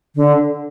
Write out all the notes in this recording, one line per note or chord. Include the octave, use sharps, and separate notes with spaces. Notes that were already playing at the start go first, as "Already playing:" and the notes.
D3